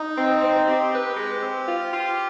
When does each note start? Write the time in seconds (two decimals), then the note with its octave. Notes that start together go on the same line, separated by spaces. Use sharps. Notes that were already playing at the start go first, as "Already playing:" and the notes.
Already playing: D#4
0.17 C4
0.42 C4
0.66 C4 G4
0.92 B4
1.17 G#3
1.42 C4
1.67 F4
1.92 F4